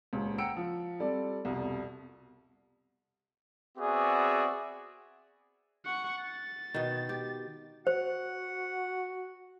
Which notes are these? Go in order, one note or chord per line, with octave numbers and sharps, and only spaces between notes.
D#1 C#2
F#5 G5 A#5 E6 C#7 D7
F3
G3 C4 A4 D5
C2 F2 B2
B3 C4 F#4 G#4 D5 E5
F#5 C#6
A6
B2 D#3
G4
F#4 C5 F#5